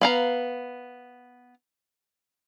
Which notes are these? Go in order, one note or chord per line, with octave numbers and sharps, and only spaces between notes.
B3 F5 A#5